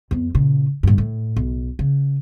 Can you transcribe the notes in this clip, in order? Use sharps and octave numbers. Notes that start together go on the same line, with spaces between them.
F2 B3
A#2 C#3
G2 A#2
A2
B1
C#3